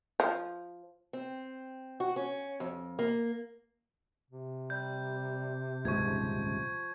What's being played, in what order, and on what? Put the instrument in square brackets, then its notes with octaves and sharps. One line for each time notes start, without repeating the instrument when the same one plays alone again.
[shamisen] F3
[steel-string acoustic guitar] C4
F#4
C#4
F2
A#3
[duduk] C3
[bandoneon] G3 [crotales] G6
[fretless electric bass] D#1 C#2 G#2 [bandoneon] F3 [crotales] C#6 G#6